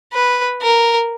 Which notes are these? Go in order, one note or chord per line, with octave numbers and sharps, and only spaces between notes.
B4
A#4